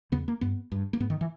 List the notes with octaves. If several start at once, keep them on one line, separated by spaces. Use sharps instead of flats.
E2 C#3 B3
A#3
G2 B3
G2
A#3
G#2 B3
D#3
E3